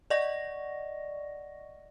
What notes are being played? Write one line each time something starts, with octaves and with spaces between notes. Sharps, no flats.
D5 D#5 F#5 C#6 A#6